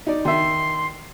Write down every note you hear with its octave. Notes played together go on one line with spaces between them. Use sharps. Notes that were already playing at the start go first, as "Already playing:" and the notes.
D#4 D5
D#3 E5 C6